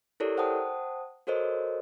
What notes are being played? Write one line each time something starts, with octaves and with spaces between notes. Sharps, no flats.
E4 G4 A4 A#4 C#5 D5
C5 F#5 G5 A5 D#6
F#4 A4 A#4 C5 C#5 D#5